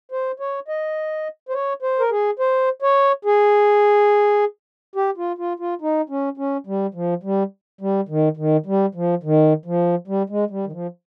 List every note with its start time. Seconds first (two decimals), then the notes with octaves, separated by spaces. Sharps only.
0.12 C5
0.40 C#5
0.68 D#5
1.49 C5
1.53 C#5
1.82 C5
1.99 A#4
2.11 G#4
2.39 C5
2.82 C#5
3.25 G#4
4.96 G4
5.17 F4
5.38 F4
5.59 F4
5.82 D#4
6.09 C#4
6.37 C#4
6.67 G3
6.94 F3
7.23 G3
7.81 G3
8.09 D#3
8.37 D#3
8.66 G3
8.95 F3
9.23 D#3
9.65 F3
10.08 G3
10.29 G#3
10.50 G3
10.66 D#3
10.72 F3